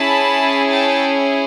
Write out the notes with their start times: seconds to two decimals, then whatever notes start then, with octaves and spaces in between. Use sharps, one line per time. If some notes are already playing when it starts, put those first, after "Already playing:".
Already playing: C#4 E4 G#4 A5 B5
0.72 G5 A5